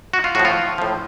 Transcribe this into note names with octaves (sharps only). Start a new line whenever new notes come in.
F#4
F4
A2 F3 F#4
F4
A2 F3